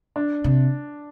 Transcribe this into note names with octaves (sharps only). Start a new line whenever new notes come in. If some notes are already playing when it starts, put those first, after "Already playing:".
D4
C3